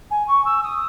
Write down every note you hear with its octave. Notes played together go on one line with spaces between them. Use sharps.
G#5
C#6
E6
D#6